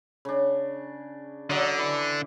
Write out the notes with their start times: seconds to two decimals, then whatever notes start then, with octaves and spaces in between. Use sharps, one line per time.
0.25 C#3 D4
1.50 D3 F#3 D5 D#5
1.78 E3